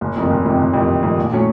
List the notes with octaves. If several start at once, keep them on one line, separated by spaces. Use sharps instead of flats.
F#1
F2 C3 D#3
F#1
F2 C3 D#3
F#1
F2 C3 D#3
F#1
F2 C3 D#3
A#1
A2 F#3 A3 C#4